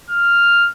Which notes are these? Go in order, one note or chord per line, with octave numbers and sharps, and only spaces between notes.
F6